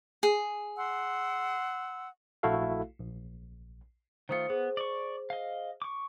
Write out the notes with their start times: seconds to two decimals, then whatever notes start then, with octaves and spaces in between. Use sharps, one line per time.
0.23 G#4
0.77 F#5 C6 E6
2.43 A#1 A3 E4 F#4 A4 F5
3.00 A#1
4.29 D#3 A3 F4 C5 D#6 C#7
4.50 B3 G#4 C5
4.77 D5 C#6
5.30 D#5 F5
5.82 C#6 D6